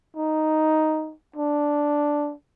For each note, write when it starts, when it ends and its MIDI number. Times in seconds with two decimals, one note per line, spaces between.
0.17 1.14 63
1.36 2.34 62